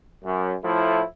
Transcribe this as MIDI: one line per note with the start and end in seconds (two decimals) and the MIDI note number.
0.24 0.53 42
0.64 1.02 45
0.64 1.02 53
0.64 1.02 57
0.64 1.02 64